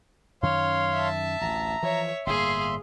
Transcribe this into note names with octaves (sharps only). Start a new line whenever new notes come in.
F#2 D#3 C#4 C#5 F5 C6
E5 A5
A1 D2 A#5
E3 F3 C#5 E5
G1 A2 A#3 G#4 E5 F5 C6